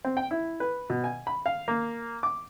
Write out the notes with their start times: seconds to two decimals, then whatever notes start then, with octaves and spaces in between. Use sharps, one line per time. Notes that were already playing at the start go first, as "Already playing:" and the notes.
0.05 C4
0.17 G5
0.31 E4
0.60 B4
0.90 B2
1.04 G#5
1.27 B5
1.46 F5
1.68 A#3
2.23 D6